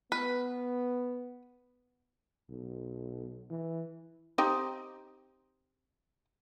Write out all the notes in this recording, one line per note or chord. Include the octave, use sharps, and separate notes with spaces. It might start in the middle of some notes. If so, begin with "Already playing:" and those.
B3 B4
B1
E3
C4 D#4 G4